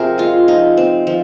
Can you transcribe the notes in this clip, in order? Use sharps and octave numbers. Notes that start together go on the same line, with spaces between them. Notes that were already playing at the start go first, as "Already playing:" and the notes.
Already playing: C3 F3 C4 G#4 A#4 C5
G#3 F4
F3 D#4
C4
F3